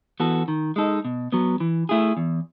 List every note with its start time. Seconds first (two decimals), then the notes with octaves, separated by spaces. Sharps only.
0.20 E3 B3 F#4 A4
0.48 D#3
0.76 G#3 D#4 A4
1.05 B2
1.32 F#3 B3
1.60 E3
1.89 A3 E4 G#4
2.17 E2